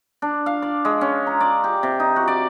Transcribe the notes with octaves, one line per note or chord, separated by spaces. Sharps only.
D4
F5
D5
G#3
C#4
A#5
D5
G4
C3
D#4
F#4
D5